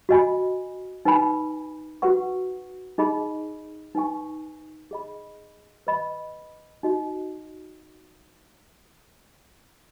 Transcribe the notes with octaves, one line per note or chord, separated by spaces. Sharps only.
F#4 D#5 G#5 B5
D#4 B4 G#5 B5
F#4 B4 F#5 C#6
D#4 G#4 D#5 B5
D#4 B4 G#5 C#6
G#4 D#5 B5
B4 D#5 B5
D#4 F#4 D#5